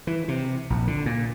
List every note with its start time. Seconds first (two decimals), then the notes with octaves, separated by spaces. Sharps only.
0.07 E3
0.28 C3
0.70 A#1
0.87 D3
1.06 A#2